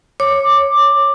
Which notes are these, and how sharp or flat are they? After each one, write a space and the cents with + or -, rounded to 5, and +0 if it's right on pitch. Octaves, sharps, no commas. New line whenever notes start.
C#5 -10 D6 +10